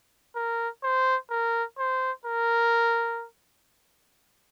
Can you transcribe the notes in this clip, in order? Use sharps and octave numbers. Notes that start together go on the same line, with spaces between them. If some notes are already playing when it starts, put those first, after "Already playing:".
A#4
C5
A#4
C5
A#4